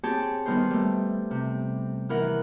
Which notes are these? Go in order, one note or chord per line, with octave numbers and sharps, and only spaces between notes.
C4 G4 G#4 C#5 G5 A5
D#3 G3 B3 D#4 C5
G3 A3
C3
D#3 E3 A#4 F#5